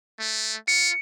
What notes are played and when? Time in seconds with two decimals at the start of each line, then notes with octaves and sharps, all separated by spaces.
0.20 A3
0.68 F4 C#7